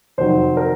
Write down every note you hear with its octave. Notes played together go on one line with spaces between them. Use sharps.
F2 C3 D#3 F#3 C5
A#4